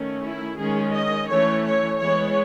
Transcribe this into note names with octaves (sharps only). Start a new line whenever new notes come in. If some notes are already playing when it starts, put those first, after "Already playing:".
Already playing: D#3 A3 C#4
E4
D#3 G#3 C#4 G#4
D#5
E3 A3 C#4 C#5
C#5
E3 G#3 B3 C#5